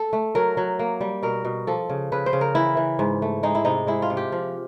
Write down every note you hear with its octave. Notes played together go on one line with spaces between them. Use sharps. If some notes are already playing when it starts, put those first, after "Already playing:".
Already playing: A4
A3
F#3 A#4
F#3
A#3
G3
B2 A#4
B2
F3 A4
C#3
C#3 B4
C5
C#3
A#4
E3 E4
E3
G#2
A3
G#3 D#4
E4
C3 D#4
G#3 E4
F4
C3
G4
F3